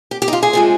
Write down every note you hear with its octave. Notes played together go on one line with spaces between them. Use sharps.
G4
G4
D#4
F4
G#4
C3 F3 G#3